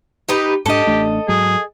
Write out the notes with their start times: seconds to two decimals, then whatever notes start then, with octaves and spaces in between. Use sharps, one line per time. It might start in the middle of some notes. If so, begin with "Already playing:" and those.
0.29 D#4 G4 B4
0.66 G#2 D4 G4 A4 D#5
0.87 A1 A3 D4
1.28 G#2 F#3 G#3 G#4